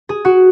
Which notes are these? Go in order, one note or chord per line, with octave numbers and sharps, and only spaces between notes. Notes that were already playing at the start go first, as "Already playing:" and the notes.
G#4
F#4